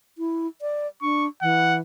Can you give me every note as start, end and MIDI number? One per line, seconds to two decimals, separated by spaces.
0.18 0.47 64
0.61 0.87 74
1.02 1.27 62
1.02 1.26 85
1.42 1.80 52
1.42 1.77 78